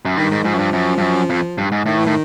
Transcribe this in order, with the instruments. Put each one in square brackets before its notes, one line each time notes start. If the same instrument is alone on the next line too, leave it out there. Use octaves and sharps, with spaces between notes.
[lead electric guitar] F#2
[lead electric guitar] G2 [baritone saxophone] D#3
[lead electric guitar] G#2
[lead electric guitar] G#2 [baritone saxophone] F3
[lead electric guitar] F#2
G2
F#2
G2
F#2
F2
G2
G#2
[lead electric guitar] A2 [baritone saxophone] D#3
[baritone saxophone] E3
[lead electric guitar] A2 [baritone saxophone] D#3